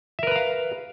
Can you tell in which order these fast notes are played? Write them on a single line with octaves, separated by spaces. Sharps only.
E5 A#4 B4 A#5 F5